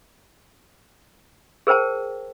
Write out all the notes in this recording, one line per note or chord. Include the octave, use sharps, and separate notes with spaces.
G#4 A#4 C5 G5 A5